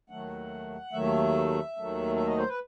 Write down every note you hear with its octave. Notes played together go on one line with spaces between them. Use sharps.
D#2 D#3 F#3 A3 F#5
D#2 D#3 F#3 A3 E5
D#2 D#3 F#3 A3
E5
D#5
C5
B4